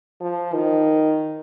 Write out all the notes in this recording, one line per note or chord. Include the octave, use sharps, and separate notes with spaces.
F3
D#3